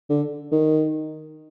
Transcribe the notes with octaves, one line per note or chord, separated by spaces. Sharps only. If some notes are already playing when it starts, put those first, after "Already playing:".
D3
D#3